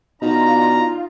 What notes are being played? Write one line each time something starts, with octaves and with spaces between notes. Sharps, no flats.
B2 D4 D#4 F4 A#5